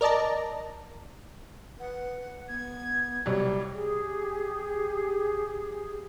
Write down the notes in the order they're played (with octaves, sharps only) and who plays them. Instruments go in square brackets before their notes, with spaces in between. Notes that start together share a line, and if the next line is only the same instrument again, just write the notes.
[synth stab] A#4 D5 D#5 A5 A#5
[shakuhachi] B4 [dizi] F#5
[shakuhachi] B3 [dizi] G#6
[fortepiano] C2 F#3 [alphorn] G3
[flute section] G4 G#4